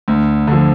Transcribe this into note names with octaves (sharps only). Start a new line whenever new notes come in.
D2
D3 F3